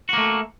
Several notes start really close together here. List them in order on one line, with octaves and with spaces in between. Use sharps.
F#4 A#3 A3